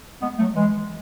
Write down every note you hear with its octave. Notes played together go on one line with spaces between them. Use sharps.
G#3 B3
F#3 A3
E3 G#3